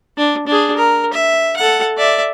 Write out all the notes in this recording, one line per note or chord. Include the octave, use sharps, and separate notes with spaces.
D4
D4 G#4
A#4
E5
A4 F#5
D5 E5